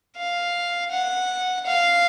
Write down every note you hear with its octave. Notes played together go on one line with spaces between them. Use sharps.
F5
F#5
F5